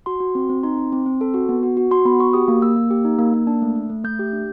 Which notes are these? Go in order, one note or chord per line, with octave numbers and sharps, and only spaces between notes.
F#4 C6
F#4
C4
C4
D#4 C6
C4
C4
C4
A4
F#4
B3
F#4
F#4
F#4 C6
B3 B5
F#4 C#6
G4 D#6
A#3
A#3 E6
A#3
G4
D#4
A#3
A#3
D4
A3
A3
A3
A3 G6
G4
D4